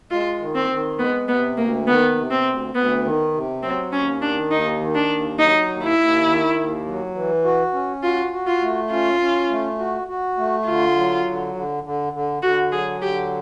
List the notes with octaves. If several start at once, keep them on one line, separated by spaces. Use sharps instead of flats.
G#3 F4
D#3
C4
D#3
G#3 B3
C3 B3
D2 A#3
D#3 B3
C3
C4
D2
D2 B3
D#3
C3
F#3 C4
D#2 C#4
D#3 D4
D#2 D#4
D#3
D4
D#2
F#3 D#4
D#2
E4
D#2
D#3
D#2
F#3
E3
F#4
C#4
F4 F#4
F#4
F4
A3
C#4 F4
C#4
A3
F#4
F#4
A3
D3 F4
F#3
D3
D3
D3
D3
D3 F#4
F#3 G#4
D3 G4